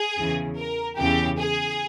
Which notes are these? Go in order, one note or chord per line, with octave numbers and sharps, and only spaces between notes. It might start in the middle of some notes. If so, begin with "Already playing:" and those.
Already playing: G#4
E2 C#3 E3
A#4
E2 C#3 E3 G4
G#4